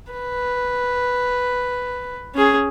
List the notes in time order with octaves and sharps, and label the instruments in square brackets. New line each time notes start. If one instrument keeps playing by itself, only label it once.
[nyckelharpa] B4
C#4 G#4